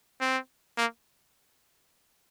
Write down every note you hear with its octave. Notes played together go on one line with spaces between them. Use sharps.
C4
A#3